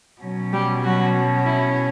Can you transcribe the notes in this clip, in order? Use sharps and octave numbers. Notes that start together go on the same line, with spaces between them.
B2 F#3 C#4
G3 G4
F#3 F#4
E4